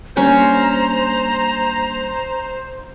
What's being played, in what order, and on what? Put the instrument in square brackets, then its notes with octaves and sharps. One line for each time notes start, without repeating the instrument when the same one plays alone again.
[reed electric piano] G3 A#3 D4 [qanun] C#4 [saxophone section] C5 [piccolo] A#5